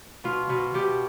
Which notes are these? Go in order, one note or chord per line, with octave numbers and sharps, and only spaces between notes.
B2 F4
B2
B2 G4